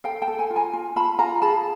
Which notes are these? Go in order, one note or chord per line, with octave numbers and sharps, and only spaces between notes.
A4 F5 G5
G5 A5
A4
F#5 G#5
F4
G#5 A#5
F4
F4 A5 B5
F4 G#5 A#5
G#4 A5 B5